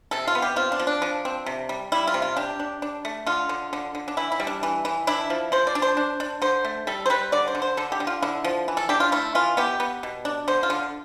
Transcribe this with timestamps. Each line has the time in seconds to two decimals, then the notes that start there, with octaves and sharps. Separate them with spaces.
0.11 C3 A4
0.28 F4
0.35 B3
0.42 G4
0.56 C4 F4
0.72 D4
0.79 F3
0.87 D4
1.02 F3
1.25 C4
1.46 C3
1.69 G3
1.92 G3 E4
2.07 F4
2.14 C3
2.22 F4
2.36 D4 G4
2.60 D4
2.82 D4
3.05 A3
3.26 D3 F4
3.49 D3
3.73 D3
3.95 D3
4.08 D4
4.17 E3 E4
4.32 E4
4.40 G3
4.47 D4
4.63 E3
4.85 E3
5.07 D4 E4
5.30 F3
5.52 F3 C5
5.67 D5
5.75 D4
5.82 C5
5.97 D4
6.20 D4
6.42 D3 C5
6.65 A3
6.87 G3 A4
7.06 C5
7.10 G3 B4
7.32 D3 D5
7.48 C5
7.55 D3
7.62 C5
7.77 D3 A4
7.92 G4
8.00 D3
8.07 F4
8.22 D3 E4
8.44 F3
8.68 E3
8.77 A4
8.89 D4 G4
9.00 F4
9.12 A3 E4
9.35 E3 F4
9.57 B3 G4
9.80 B3
10.03 B2
10.25 D4
10.48 D3 C5
10.63 F4
10.70 D3